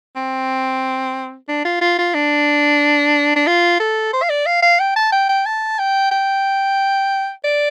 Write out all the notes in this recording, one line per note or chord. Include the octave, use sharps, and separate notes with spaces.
C4
D4
F4
F4
F4
D4
D4
F4
A4
C5
F5
D5
F5
F5
G5
A5
G5
G5
A5
G5
G5
D5